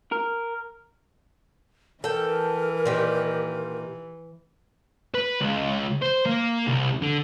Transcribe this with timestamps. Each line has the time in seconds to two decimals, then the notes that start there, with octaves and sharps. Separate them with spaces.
0.12 A#4
2.04 E3 A4 A#4 G5
2.86 A#2 D#3 G4
5.14 B4
5.41 C#2
6.02 C5
6.26 A#3
6.67 C2
7.02 D3